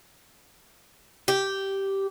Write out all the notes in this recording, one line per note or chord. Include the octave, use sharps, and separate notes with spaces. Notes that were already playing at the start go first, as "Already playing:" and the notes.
G4